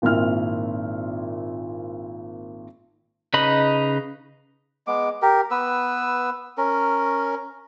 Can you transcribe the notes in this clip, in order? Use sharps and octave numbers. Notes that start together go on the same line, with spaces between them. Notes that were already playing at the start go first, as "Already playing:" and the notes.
G#1 A#2 C4 E4 E5 F6
C#3 D#4 B4 D#5 B5
G#3 B3 D6
G4 A#4
B3 B4 E6
C#4 A#4